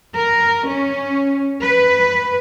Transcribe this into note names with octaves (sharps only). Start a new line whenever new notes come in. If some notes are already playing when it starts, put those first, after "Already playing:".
A#4
C#4
B4